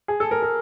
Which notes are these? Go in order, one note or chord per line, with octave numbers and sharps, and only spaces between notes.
G#4
A4
A#4
A#4